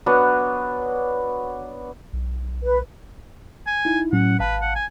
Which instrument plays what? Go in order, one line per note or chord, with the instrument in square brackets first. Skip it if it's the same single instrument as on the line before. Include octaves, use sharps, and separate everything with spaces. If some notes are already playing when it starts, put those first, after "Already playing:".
[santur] F#3 B3 D4 F#5
[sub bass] B1
[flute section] B4
[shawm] G#5
[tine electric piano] D#4 E4
[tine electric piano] A2 F#3 C#4 [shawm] F#5
[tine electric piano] G#1 F5 A5 [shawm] B4
[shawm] F#5
G#5